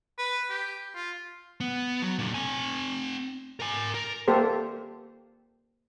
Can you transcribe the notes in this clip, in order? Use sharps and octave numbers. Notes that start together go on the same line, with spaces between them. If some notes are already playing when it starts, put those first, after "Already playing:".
B4
G4
F4
B3
F#3
A#2 D3
C4 G#5
A#4 G#5
A#4
A#3 G4 A4 C5